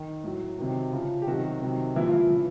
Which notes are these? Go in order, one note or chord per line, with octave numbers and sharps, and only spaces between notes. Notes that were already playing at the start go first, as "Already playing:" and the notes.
Already playing: D#3
A2 F#3
C3 D#3 F#3
C#3 F3
G4
C3 D#3 F#3 F#4
C3 D#3 F#3
A#2 E3 F3 E4
F4
E3 E4
C#3 E3